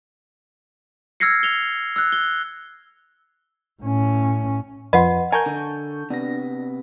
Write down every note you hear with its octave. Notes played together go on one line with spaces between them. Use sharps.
E6 F6 G#6 A#6 C7 C#7
F7 G7
E6 F#6
G7
A2 C#4
F2 F3 B4 D#5 F#5 C6
A#4 G#5 A5 C#6 G6
D3
C3 B3 D4 A#6